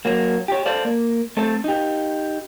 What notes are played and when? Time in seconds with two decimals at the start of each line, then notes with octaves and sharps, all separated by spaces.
0.05 F#3 A#3
0.48 G4 C#5
0.66 A4 C5 D5 F5
0.85 A#3
1.37 A3 C4 A4
1.64 D#4 G4